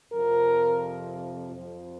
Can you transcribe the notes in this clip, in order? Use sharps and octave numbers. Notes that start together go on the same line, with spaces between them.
F2 C3 F3 A#4
F2 F3